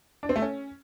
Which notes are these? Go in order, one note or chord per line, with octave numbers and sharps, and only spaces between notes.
D4
C4
A3
C#4